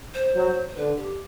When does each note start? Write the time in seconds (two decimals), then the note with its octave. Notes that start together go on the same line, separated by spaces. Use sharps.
0.14 C5
0.35 F#3
0.70 C5
0.76 D3 B4
0.97 G4